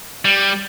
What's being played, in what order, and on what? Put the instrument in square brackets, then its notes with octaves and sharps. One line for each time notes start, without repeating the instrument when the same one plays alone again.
[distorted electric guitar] G3